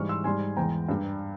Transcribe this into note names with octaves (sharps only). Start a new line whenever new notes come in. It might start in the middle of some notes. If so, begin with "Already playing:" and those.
Already playing: G#2 E3 G3 C#6 F6
C6 E6
G#2 G3 G#5 C6
E2 E3 G#3 G5 A#5
G2 G3